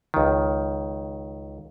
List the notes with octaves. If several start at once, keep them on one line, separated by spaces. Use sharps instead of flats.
C#2 D#3